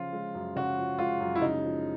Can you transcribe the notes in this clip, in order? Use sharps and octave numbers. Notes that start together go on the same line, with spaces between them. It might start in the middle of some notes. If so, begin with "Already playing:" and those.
Already playing: C#3 F3 F4
G#3
F#2
C#3 F#4
F3
G#3 F4
F#2
E4
C#3 D#4
F3